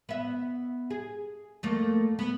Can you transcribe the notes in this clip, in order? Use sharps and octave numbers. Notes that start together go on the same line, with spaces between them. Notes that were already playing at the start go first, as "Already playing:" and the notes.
B3 E5
G#4
F2 A3 A#3
B3